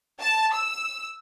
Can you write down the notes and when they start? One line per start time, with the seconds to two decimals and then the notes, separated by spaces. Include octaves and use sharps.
0.20 A5
0.53 E6